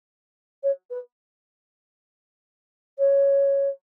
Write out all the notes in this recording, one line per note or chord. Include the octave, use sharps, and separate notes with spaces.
C#5
B4
C#5